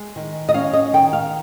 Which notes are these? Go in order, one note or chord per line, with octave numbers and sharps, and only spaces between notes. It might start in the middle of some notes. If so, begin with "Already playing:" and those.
Already playing: G#3
D#3
D#5
C#4 F5
D#5
D#3 G5
F5